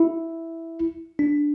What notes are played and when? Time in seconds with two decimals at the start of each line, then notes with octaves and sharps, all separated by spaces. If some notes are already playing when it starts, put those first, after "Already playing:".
Already playing: E4
1.19 D4